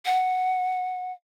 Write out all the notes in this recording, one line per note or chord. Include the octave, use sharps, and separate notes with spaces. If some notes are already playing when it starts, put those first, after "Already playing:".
F#5